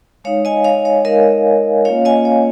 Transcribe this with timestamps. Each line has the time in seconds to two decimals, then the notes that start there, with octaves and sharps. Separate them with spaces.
0.24 G#3 D#4 C#5 F5
0.45 D#5 G#5
0.64 C#5 F5
0.85 C#5 F5
1.05 G#3 D#4 A#4 D#5
1.85 A#3 C#4 F4 C#5 F5
2.05 D#5 G#5
2.25 C#5 F5